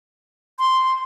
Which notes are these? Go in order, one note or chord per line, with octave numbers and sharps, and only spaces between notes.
C6